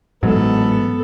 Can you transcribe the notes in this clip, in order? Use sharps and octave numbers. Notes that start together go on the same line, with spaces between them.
A1 G#2 F#3 B3 A4